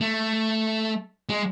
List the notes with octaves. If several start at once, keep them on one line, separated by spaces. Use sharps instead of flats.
A3
G#3